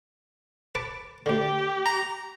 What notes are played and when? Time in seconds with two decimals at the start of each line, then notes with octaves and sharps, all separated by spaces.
0.75 B4 A5 D6
1.26 D2 D3 G4
1.86 A#5